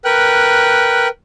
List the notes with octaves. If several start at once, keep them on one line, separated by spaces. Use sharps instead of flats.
A#4 B4 G5 F#6